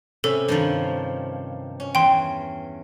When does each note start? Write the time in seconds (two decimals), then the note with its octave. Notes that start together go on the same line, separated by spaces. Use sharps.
0.24 C3 C#4 A4 B5
0.48 G2 D#3 F3
1.80 C#4
1.95 E2 G5 C6